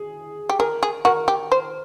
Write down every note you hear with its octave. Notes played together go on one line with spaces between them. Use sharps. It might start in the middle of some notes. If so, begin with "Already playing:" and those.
Already playing: G#4
G4
G#4 A#4
G#4
F#4 A#4
G4
C5